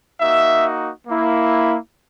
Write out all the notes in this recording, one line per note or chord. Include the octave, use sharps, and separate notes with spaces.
A#3 D#4 F#4 E5
A#3 E4